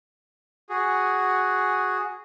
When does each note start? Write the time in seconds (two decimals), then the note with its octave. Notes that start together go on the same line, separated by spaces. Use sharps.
0.70 F#4 G#4